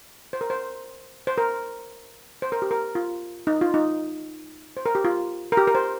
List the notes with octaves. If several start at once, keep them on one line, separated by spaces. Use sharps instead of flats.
C5
A#4
C5
C5
A#4
C5
A#4
G4
A#4
F4
D#4
F4
D#4
C5
A#4
G4
F4
A#4
G4
A#4
C5